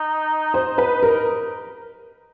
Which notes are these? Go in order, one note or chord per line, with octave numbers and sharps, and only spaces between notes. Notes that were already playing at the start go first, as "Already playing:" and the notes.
Already playing: D#4
D#4 C5
B4
A#4